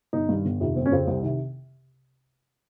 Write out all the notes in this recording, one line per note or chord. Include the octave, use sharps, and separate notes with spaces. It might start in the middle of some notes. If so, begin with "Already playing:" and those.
G1 D#4
G2 D#3
G1
F2 C3 D#3
G1 C4
C#4
F2 C#3 F3 C4
C2
C3 D#3